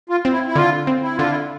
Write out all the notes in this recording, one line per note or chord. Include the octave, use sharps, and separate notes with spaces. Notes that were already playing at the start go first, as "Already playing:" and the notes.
F4
C4
E4
E4
D3 F4
C4
E4
D3 F4
E4